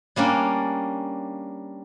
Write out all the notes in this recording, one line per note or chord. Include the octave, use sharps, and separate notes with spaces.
G3 A#3 C#4 D4